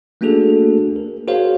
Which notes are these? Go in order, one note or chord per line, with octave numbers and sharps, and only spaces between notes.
A3 A#3 D4 F#4 G#4 A4
A#4
F#4 G#4 A#4 C5 C#5 F5